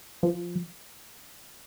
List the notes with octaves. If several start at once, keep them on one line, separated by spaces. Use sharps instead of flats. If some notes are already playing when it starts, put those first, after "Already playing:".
F3